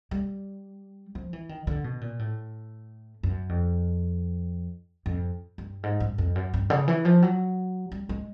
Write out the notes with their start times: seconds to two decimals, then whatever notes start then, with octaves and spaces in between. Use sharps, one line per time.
0.11 G3
1.15 F3
1.33 E3
1.49 D#3
1.67 D3
1.84 B2
2.01 A#2
2.19 A2
3.23 F#2
3.49 F2
5.06 F2
5.58 G2
5.83 G#2
6.00 G2
6.18 F2
6.36 F#2
6.54 G2
6.70 C#3
6.88 E3
7.05 F3
7.23 F#3
7.92 G3
8.09 G#3